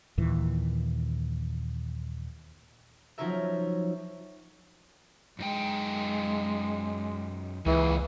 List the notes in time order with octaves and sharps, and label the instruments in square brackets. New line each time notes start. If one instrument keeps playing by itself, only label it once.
[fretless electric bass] D#2 A#2 E3
[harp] F3 F#3 C#4 D#4 A#4 E5
[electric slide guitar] F#2 D#4 G5 [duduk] G#3
[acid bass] C#2 [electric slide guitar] C#3 A#3 G#4 [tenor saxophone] E3